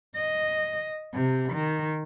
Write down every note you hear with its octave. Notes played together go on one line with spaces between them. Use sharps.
D#5
C3
D#3